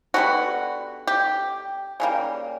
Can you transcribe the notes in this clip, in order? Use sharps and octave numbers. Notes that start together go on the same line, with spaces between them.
D3 G3 B3 F#4
G4
C#3 E3 G3 A#3